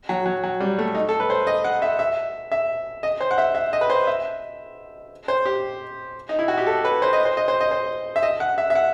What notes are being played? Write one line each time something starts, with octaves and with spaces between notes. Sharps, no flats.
F#3
F#3
F#3
G3
A3
D#4
A4
B4
C5
D#5
F#5
E5
E5
E5
D#5
C5
F#5
E5
E5
D#5
B4
C5
E5
C5
G4
D#4
E4
F#4
G4
A4
B4
C5
D#5
C5
D#5
C5
D#5
C5
E5
D#5
F#5
E5
E5
F#5